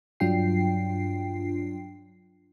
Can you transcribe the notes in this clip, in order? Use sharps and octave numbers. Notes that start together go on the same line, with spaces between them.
G2 F#3 D4 F4 G5 C7